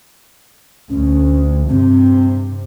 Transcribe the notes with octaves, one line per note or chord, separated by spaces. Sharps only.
D2 C#4
G2 C3 C4